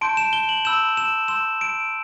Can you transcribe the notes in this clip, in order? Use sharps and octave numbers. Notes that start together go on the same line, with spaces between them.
A5 C6 G6 D7
E7
G7
F#7
B5 E6 G6 E7
E7
C6 E6 G6 E7
D7